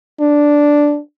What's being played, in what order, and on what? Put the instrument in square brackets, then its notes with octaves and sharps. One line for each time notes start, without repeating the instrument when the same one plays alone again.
[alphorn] D4